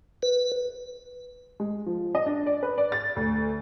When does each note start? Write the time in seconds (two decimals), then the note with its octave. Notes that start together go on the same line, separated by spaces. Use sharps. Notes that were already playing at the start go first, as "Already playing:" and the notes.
0.23 B4
1.60 G#3
1.86 F3
2.15 D#5
2.26 D4
2.46 D5
2.63 B4
2.78 D5
2.92 A6
3.16 D2